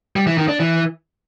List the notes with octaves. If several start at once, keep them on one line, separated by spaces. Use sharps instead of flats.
G3
E3
D#3
D4
E3